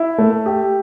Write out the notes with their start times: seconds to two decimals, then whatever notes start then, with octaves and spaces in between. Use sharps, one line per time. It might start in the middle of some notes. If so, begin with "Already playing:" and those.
Already playing: E4
0.18 A3
0.46 G4